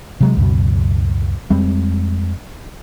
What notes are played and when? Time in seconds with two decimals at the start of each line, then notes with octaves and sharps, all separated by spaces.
0.20 C3 F#3 G#3
0.37 C#2 F#2 B2
1.50 F2 G3 G#3 C4